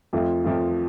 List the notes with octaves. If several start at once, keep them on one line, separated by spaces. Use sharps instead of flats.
F2 F3 A3 F4
F2 F3 A3 F4